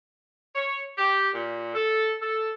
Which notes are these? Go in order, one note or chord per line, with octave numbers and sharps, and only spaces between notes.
C#5
G4
A#2
A4
A4